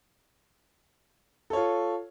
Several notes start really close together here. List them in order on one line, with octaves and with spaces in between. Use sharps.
A4 C#5 F4